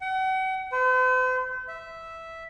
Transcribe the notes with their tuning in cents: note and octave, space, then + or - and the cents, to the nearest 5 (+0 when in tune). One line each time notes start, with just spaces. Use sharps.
F#5 +40
C5 -45
E5 -5